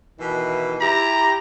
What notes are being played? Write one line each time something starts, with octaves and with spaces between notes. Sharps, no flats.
B2 D#3 E3
E4 G4 A#5